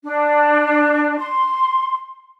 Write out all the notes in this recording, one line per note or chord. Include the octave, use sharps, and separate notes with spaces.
D4
C6